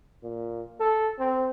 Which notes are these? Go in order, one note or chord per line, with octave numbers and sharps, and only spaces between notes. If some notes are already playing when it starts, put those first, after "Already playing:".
A#2
A4
C4